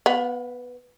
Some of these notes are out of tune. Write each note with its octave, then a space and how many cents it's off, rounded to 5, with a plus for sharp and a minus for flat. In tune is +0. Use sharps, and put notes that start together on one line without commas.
B3 +0 F5 +40